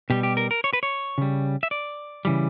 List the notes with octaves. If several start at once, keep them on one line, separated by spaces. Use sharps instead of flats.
B2 G3 G4
G4
A#4
A#4
C#5
B4
C#5
C#3 G3
E5
D5
C#3 E3 G3